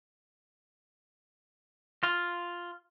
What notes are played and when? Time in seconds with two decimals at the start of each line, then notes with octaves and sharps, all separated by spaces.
2.03 F4